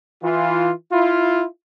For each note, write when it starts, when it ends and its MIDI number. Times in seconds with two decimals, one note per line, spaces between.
0.22 0.69 52
0.22 0.69 65
0.90 1.44 64
0.90 1.44 65